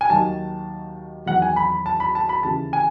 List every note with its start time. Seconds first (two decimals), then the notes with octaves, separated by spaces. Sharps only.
0.01 G#5
0.10 D#2 D#3 F#3 A5
1.26 E2 D#3 F#3 F#5
1.42 G#5
1.56 B5
1.70 B5
1.86 A5
2.00 B5
2.15 A5
2.29 B5
2.43 D#2 C#3 E3 A5
2.73 G#5